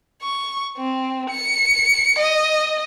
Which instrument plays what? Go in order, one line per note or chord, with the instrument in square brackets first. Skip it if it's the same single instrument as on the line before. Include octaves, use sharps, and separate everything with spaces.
[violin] C#6
C4
C#7
D#5